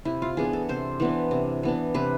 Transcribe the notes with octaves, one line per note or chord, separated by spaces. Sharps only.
C3 E4
F4
E3 B3 D4 G#4
A4
C3 C5
E3 B3 D4
C3
E3 B3 D4
C3 B4